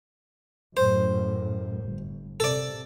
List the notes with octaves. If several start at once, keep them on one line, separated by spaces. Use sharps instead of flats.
F#2 A2 C5
G1
C3 A4 D5